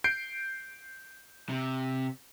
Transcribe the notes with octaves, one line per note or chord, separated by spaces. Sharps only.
G6 C7 D7
C3